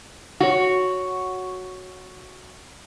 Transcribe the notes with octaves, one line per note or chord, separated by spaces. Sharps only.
F#4 C#5